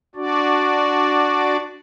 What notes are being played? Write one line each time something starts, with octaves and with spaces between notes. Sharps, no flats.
D4 F#4 D5